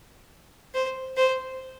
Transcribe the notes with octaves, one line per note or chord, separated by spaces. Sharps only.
C5
C5